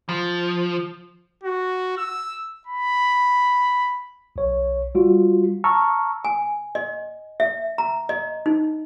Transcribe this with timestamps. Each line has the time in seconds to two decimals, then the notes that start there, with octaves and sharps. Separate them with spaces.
0.09 F3
1.44 F#4
1.97 E6
2.67 B5
4.36 B1 C#5
4.95 G3 F4 F#4
5.64 A5 A#5 C#6 E6 F6
6.25 G#5
6.75 D#5
7.40 E5
7.78 A#5
8.09 D#5
8.46 D#4